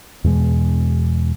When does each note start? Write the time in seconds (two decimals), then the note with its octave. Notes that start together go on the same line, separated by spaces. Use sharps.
0.24 E2 B2 G#3